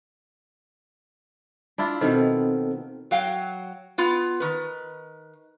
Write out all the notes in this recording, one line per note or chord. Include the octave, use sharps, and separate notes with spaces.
D4 E4 F4
B2 D#3 C4 A4 C5
F#3 F5 G5
B3 F4
D#3 B4